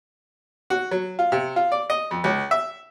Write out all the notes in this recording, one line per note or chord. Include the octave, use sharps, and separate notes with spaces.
F#4
F#3
F4
C3
F4
D5
D#5
F2
C#2
E5